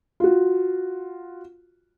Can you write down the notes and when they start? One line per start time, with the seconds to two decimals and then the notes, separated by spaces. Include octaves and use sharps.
0.20 F4 F#4